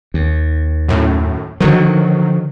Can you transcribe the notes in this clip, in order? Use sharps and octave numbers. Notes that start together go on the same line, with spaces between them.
D#2
F#2 A2
D3 D#3 F3 F#3